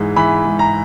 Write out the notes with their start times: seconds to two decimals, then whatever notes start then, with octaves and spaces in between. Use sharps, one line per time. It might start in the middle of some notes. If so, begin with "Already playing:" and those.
Already playing: G#2 E3 G#3
0.16 E3 B5
0.45 G#2
0.59 A#5